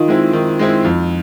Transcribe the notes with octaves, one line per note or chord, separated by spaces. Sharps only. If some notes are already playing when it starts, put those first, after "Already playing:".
Already playing: D#3 D#4 F4
G#3 C4 E4
D#3
G#3 C4 E4
F2